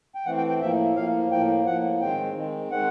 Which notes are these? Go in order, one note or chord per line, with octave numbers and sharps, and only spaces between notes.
G5
E3 A3 C4 F#5
G5
G5
A2 F3 A#3 E5
A2 F3 A#3 F5
A2 F3 A#3 G5
A2 F3 A#3 F#5
D#3 G#3 C4 G5
D#3 G#3 C4
D#3 G#3 C4 F#5